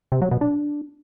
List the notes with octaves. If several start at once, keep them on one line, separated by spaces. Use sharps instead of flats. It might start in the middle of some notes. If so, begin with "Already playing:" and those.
C3
F#3
B2
D4